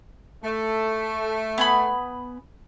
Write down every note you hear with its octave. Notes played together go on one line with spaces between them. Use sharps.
A3
B3 G#5 B5